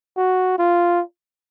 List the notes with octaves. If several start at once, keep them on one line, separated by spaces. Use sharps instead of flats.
F#4
F4